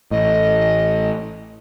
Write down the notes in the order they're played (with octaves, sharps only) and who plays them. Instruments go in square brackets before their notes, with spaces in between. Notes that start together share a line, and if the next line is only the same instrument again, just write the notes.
[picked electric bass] A1 A2 [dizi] D#5